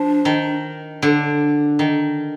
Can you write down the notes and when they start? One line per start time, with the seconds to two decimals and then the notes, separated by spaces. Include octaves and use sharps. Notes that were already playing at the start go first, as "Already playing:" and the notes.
Already playing: F3 D4
0.25 D#3
1.02 D3
1.79 D#3